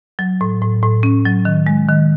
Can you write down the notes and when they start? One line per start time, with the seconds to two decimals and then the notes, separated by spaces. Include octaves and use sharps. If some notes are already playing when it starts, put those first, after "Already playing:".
0.19 F#3
0.41 A2
0.62 A2
0.83 A2
1.03 C#4
1.25 F#3
1.45 D#3
1.67 G#3
1.89 D#3